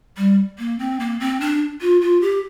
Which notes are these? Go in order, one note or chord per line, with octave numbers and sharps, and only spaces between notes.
G3
A#3
C4
A#3
C4
D4
F4
F4
G4